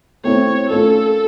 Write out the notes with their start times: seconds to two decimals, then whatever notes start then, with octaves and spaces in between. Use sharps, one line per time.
0.24 A3 C4 E4 C#5
0.69 A3 C#4 F4 A4 A#4